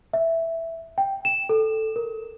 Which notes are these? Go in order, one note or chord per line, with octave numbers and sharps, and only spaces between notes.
E5
G5
E7
A4
A#4